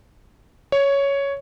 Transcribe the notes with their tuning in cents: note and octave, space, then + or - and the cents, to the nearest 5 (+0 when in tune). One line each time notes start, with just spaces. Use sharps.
C#5 +5